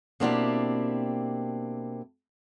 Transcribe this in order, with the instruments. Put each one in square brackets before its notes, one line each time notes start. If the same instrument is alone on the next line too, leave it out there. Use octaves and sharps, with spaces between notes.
[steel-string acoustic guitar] B2 A#3 C4 D4 E4 G4